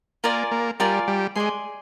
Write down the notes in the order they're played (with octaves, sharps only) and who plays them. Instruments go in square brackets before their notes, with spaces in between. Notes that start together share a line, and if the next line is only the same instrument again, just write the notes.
[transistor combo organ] A#3 [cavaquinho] F4 A#4 D5 G#5
[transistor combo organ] A#3
[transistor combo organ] G3 [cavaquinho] F4 A#4 D5 G#5
[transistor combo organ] G3
[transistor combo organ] G#3 [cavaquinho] D5 G#5 C6